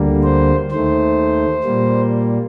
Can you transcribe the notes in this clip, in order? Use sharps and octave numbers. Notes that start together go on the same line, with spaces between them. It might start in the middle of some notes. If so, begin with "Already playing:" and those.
Already playing: D2 D3 G3 A#3
C5
D#2 D#3 A3 C5
A#2 G3 A#3